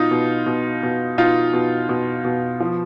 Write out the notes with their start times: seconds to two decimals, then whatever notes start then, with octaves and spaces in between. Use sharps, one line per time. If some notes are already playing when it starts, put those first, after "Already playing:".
Already playing: B2 D#4 F4
0.11 B2
0.46 B2
0.83 B2
1.18 B2 D#4 F4
1.54 B2
1.89 B2
2.25 B2
2.60 F3